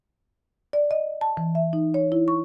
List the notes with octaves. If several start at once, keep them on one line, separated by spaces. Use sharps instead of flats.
D5
D#5
A5
E3
E5
D#4
C#5
E4
C#6